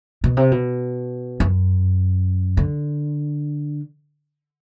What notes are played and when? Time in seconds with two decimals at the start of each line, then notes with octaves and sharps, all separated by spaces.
0.24 B2
0.37 C3
0.52 B2
1.40 F#2
2.57 D3